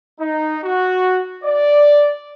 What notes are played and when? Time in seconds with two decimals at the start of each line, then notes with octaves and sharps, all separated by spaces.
0.20 D#4
0.64 F#4
1.44 D5